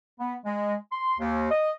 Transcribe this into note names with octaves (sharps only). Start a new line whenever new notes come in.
B3
G#3
C6
D#2
D#5